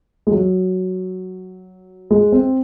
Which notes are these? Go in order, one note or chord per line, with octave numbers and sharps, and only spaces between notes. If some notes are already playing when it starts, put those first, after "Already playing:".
G#3
F#3
G#3
C4